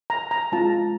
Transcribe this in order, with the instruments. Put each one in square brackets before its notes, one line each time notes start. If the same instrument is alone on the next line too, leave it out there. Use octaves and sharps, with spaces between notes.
[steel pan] A#5
A#5
G#3 C4 F4 A5